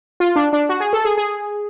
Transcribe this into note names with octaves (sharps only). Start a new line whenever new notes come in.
F4
D4
D4
F#4
G#4
A4
G#4
G#4